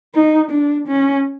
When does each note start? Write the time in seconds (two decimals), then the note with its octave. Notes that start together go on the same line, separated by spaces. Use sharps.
0.15 D#4
0.51 D4
0.87 C#4